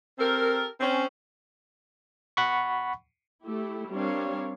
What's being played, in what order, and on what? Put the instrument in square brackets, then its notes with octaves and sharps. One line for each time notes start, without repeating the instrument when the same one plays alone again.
[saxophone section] C4 G4 A4 A#4
C4 C#4
[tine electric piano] F#5 B5 C#6
[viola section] A3 E4 G4
G3 C4 D4 A#4 C#5 F5